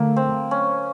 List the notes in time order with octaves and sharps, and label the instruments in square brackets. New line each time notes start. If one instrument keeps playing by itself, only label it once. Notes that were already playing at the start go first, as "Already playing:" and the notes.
Already playing: [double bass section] D3 F#3 A3 [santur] A#3
[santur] C4
C#4